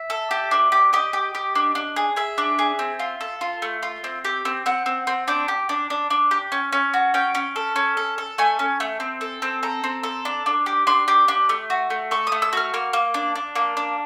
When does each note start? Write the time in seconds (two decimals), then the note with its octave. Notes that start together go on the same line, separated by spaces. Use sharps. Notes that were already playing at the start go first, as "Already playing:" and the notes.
Already playing: E5
0.10 A4
0.31 G4
0.51 D4
0.72 G4
0.93 G4 D#5
1.13 G4
1.35 G4
1.55 D4
1.75 D4
1.96 G#4
2.16 G#4 E5
2.38 D4
2.59 G#4
2.79 C4
2.99 F4
3.21 A4
3.41 F4
3.62 A3
3.83 F4
4.04 C4
4.25 G4
4.45 C4
4.66 C4 F#5
4.86 C4
5.07 C4
5.28 D4 G5
5.48 G4
5.69 D4
5.90 D4
6.10 D4
6.31 G4
6.52 C#4
6.72 C#4
6.94 F#4
7.14 C#4 G5
7.35 C#4
7.56 A4
7.76 C#4
7.97 A4
8.18 A4
8.38 A3 G#5
8.59 C#4
8.80 A3
9.00 C4
9.21 A4
9.42 C4
9.63 A4 A#5
9.84 C4
10.03 A4
10.25 D4
10.46 D4
10.66 G4
10.87 D4 C6
11.08 G4
11.28 D4
11.49 A3
11.70 F#4
11.90 A3
12.11 A4 C#6
12.27 D#6
12.32 A3
12.42 E6
12.53 F#4 F6
12.74 A#3 F6
12.93 A#3
13.14 D4
13.36 D4
13.55 A#3
13.77 D4